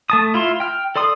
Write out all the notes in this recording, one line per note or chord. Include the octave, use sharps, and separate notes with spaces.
A3 A5 D#6
E4 F4 E5 C6
G5 F6
A4 D5 C6 D#6